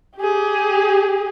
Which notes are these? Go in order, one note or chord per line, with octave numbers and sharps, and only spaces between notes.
G4 G#4